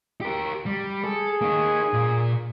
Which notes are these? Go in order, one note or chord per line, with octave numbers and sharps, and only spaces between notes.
G4 A#4
G3
G#4 A4
A#3 D#4
A#2